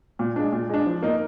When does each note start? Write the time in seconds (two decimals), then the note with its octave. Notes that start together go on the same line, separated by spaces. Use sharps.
0.19 A#2
0.36 G#3 D4
0.53 A#2
0.69 G#3 D4
0.86 F3
1.02 A#3 D#4